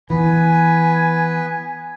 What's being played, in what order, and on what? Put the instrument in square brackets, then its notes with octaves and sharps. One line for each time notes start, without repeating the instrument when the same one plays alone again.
[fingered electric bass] E3 [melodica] B3 B4 [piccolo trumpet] G#5